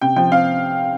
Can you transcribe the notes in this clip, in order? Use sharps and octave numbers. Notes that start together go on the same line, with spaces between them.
C3 G5
F3 G5
C4 F5